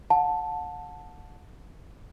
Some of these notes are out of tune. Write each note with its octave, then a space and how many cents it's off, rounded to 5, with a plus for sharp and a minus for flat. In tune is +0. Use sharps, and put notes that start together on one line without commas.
F#5 -35 A5 +0